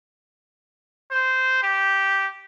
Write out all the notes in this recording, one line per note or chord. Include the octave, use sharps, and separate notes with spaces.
C5
G4